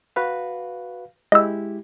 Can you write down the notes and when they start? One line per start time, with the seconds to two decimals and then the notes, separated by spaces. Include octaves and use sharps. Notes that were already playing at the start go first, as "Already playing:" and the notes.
0.16 F#4 B4 F5
1.32 G#3 E4 G4 D#5 E6